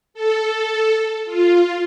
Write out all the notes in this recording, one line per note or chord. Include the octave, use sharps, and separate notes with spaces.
A4
F4